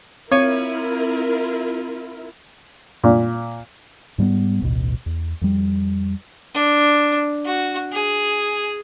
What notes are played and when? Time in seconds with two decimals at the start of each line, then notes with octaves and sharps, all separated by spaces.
0.32 C4 E4 F4 A#4 C#5 D#7
3.04 A#2
4.18 G#2 G3 G#3 B3
4.62 A1 D2 B2
5.06 E2
5.41 F2 G3
6.55 D4
7.46 F#4
7.92 G#4